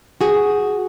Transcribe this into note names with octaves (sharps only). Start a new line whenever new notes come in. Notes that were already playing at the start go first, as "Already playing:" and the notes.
F#4 G#4